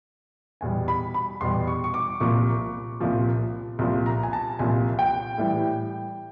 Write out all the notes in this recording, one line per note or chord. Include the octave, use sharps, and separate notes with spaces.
E2 B2 G3 G#5
B5
B5
E2 B2 G3 C6
C#6
C#6
D6
C2 A#2 F3 C#6
C2 A#2 F3
C2 A#2 F3
A#5
G#5
A5
C2 A#2 F3 G#5
G5
A2 E3 G3